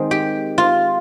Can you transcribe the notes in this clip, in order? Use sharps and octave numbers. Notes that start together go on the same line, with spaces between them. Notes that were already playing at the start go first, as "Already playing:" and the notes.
Already playing: D#3 G#3 C4
G4
F4